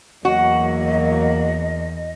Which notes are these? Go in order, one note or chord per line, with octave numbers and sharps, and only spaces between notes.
E2 F#3 A#3 F#4 D#5